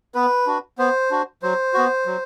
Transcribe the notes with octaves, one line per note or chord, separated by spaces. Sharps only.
B3 B4
D4 F#4
B3 C5
D4 F#4
F#3 C5
B3 F#4
F#3